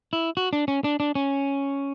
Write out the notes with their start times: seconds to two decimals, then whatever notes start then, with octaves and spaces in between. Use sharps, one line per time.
0.13 E4
0.37 F#4
0.53 D4
0.68 C#4
0.84 D4
1.00 D4
1.15 C#4